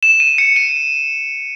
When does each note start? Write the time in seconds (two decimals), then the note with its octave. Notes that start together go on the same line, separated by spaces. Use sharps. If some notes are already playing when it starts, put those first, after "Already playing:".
0.03 E7
0.20 D#7
0.38 C#7
0.56 D#7